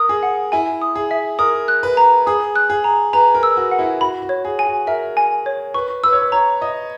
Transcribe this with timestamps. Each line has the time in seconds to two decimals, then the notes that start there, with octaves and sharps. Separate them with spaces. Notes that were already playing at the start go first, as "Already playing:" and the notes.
Already playing: A#4 D#6
0.09 G#4
0.23 F#5
0.52 E4 G#5
0.82 D#6
0.96 G#4
1.11 E5
1.39 A#4 D#6
1.68 F#6
1.83 B4
1.97 A#5
2.27 G#4 D#6
2.56 F#6
2.70 G#4
2.84 A#5
3.13 B4 A#5
3.35 A#4
3.43 E6
3.57 F#4
3.71 F#5
3.79 E4
4.01 F#4 B5
4.22 F#4
4.29 C#5
4.45 G#4
4.59 G#5
4.66 F#4
4.87 A#4 E5
5.17 G#5
5.46 C#5
5.74 B4 C#6
6.03 B4 E6
6.12 C#5
6.22 B4
6.32 C#5 A#5
6.61 D#5 D#6